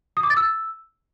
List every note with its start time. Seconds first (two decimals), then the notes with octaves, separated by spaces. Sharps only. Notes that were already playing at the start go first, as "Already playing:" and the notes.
0.17 D#6
0.23 D6
0.30 A6
0.37 E6